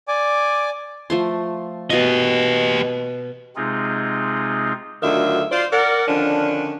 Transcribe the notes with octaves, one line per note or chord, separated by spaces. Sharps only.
D5 G#5 D6
F3 A3 C6
B2 G4 D#5 F5 C#6
C3 G#3 C4 D#4 F4 G#4
D2 D3 D#3 F#3 F4 E5
F4 C5 D5
A#4 D5 F#5
D3 D#3 F3 C#4 D4